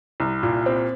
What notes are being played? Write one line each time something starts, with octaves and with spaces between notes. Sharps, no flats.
C2
A#2
C4